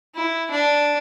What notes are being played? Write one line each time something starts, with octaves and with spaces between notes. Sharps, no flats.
E4
D4